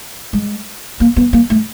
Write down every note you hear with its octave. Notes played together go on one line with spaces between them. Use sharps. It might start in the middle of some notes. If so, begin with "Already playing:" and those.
G#3
A#3
B3
A#3
A3